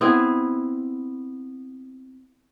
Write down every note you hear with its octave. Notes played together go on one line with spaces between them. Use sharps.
B3 C4 E4 G#4